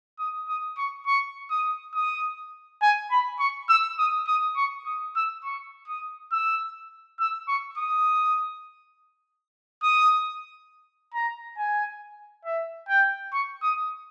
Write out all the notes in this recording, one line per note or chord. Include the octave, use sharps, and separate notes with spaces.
D#6
D#6
C#6
C#6
D#6
D#6
G#5
B5
C#6
E6
D#6
D#6
C#6
D#6
E6
C#6
D#6
E6
E6
C#6
D#6
D#6
A#5
G#5
E5
G5
C#6
D#6